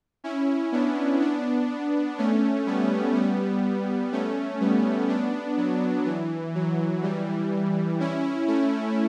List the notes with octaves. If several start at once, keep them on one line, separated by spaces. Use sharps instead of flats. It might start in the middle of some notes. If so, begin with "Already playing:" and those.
C#4 E4
B3 D4
B3 D4
A3 C#4
G3 B3
G3 B3
A3 C#4
G3 B3
B3 D4
F#3
E3
F#3
E3 G3
C#4 E4
A3 C#4